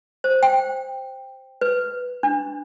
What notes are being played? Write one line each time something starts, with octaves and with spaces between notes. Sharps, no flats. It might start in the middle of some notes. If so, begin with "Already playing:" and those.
C5
G5
B4
D4